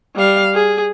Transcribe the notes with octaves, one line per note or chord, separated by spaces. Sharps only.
G3 F5
G#4